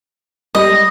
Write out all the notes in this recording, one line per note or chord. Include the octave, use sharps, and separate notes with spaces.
G3 G4 D#5